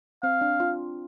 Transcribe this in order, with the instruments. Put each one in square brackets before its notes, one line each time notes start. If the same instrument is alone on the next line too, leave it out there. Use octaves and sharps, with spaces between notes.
[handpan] C4 [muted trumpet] F5
[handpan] D4
F4